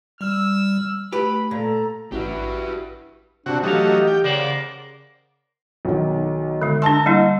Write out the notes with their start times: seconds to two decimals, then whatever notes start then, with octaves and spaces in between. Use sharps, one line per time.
0.21 G3 E6 F6
1.12 A3 G4 B4 B5
1.51 A#2 A4 A#5
2.12 A1 E4 F#4 G4 B4
3.46 C3 D4 F#4
3.63 E3 F#3 A3 D#4 G4 F5
4.07 G5
4.24 C#3 A#4 C5 D5 F#5
5.85 B1 D#3
6.62 D3 G#3
6.82 D4 A5 C6 E6
7.06 G3 A#3 E4